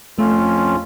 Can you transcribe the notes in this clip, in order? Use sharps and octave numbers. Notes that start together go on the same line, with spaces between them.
F2 A3 C#4 F4